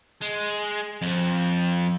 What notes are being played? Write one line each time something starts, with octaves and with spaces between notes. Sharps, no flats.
G#3
F2